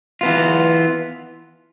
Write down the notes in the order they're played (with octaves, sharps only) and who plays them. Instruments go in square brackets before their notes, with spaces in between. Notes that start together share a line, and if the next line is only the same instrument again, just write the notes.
[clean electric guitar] E3 B3 F4